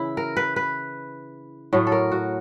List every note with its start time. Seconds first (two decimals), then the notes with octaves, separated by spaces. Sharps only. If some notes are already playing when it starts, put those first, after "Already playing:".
Already playing: C#3 E3 E4
0.17 A#4
0.37 B4
0.56 B4
1.73 A2 F#3 A3
1.87 A4
1.92 A#4
2.12 F#4